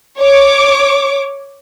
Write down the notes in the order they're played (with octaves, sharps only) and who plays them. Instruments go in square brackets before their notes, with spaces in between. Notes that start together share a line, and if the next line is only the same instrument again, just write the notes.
[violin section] C#5 D6